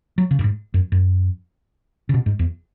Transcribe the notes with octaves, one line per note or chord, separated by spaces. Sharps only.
F#3
C#3
F#2
G#2
F#2
F#2
C#3
B2
G#2
E2